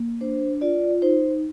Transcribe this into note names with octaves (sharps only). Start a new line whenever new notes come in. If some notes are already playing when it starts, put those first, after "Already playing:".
Already playing: A#3
D4 C5
F4 D5
D#4 C5